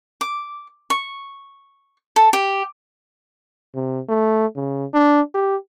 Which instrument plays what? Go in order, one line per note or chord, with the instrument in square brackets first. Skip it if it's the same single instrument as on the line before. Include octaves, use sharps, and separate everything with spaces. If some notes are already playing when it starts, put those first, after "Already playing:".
[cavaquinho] D6
C#6
A4
G4
[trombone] C3
A3
C#3
D4
G4